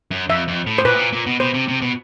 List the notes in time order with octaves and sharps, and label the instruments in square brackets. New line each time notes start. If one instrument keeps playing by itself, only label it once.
[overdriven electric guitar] F#2
[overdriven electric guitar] F2 [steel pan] E5
[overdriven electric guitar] F2
A2
[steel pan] C5
[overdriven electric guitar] A#2 [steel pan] B4
[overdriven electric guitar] A2
A#2
A#2
B2
[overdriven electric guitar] B2 [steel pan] C5
[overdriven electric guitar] C3
C3
B2